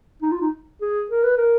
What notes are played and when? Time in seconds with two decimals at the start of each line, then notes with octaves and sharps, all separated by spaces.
0.22 D#4
0.32 F4
0.41 D#4
0.81 G#4
1.11 A#4
1.24 B4
1.37 A#4